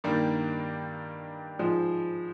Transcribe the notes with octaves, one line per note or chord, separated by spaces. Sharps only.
G2 D#3 G3 A#3 D4
G#2 F3 G#3